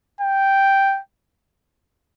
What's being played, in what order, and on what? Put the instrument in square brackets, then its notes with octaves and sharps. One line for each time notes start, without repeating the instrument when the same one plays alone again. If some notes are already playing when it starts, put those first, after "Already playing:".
[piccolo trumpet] G5